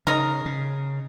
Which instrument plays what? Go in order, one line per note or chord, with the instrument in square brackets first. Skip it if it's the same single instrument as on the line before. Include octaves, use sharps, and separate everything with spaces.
[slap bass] C#3 [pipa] D#4 A#4
[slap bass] C#3